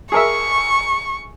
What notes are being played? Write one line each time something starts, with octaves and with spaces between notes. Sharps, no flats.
G#4 A#4 E5 C#6